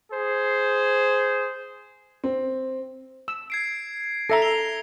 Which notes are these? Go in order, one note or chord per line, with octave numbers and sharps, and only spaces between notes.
G#4 C5
C4
E6
G#6 C7 D7
A4 E5 A#5 A#6 C#7
C7 F7 G7